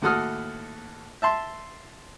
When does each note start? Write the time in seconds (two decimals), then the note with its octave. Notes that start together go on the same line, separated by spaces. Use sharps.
0.02 D#2 A2 F#4 A4 D#6 F6
1.22 E5 A5 C6